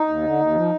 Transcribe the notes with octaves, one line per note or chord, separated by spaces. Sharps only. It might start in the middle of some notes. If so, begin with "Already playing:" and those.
Already playing: D#4
D#2
D3
D#2
F3